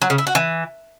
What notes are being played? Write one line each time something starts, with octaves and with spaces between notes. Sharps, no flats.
F#3
C#3
E4
F#4
E3